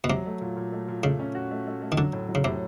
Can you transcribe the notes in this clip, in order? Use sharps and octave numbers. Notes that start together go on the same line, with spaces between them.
B2
C3 F#3
A3
A#2
A#2
A3
A#2
C#3 A3
C#4
F#4
A3
A3
A3
D#3
D3 F#3
A2
F#3
C#3
A2 C3